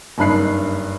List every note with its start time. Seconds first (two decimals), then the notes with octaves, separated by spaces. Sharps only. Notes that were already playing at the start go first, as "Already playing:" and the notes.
0.18 F#1 G2 D#4 B5 F#6 C7